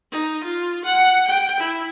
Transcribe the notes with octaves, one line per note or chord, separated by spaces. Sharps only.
D#4
F4
F#5
G5
E4